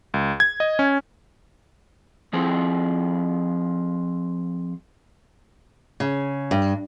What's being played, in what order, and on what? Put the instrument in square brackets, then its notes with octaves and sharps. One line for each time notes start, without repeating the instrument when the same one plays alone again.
[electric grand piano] C#2
G#6
D#5
C#4
[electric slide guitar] F3 C4 G#4
[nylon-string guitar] C#3
G2